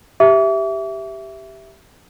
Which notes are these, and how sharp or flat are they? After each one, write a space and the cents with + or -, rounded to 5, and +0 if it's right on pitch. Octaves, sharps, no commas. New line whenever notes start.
G4 +0 E5 +0 D6 -45